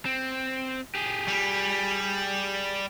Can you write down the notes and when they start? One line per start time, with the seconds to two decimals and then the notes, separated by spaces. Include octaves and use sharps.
0.05 C4
0.95 G4 G#4
1.28 G3